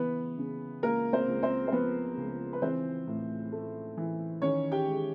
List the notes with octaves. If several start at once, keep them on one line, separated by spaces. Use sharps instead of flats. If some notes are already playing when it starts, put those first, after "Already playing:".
Already playing: C#3 E3 B3 B4
C#3
C#2 A#3 A#4
C4 C5
C#2
C4 C5
C5
F3 B3 B4
C#2
B4
E3 C4 C5
A2
A3
E3
D#3 C#4 C#5
G4 G5
G#3